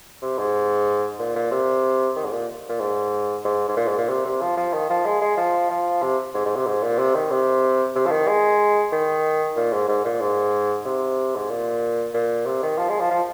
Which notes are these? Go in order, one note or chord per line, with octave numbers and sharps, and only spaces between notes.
C3
G#2
A#2
A#2
C3
D#3
G#2
A#2
A#2
G#2
G#2
G#2
A#2
G#2
A#2
C3
C3
F3
F3
D#3
F3
G#3
G#3
F3
F3
C3
G#2
G#2
C3
G#2
A#2
C3
D#3
C3
C3
F3
D#3
G#3
D#3
A#2
G#2
G#2
A#2
G#2
C3
G#2
A#2
A#2
C3
D#3
F3
G#3
F3
F3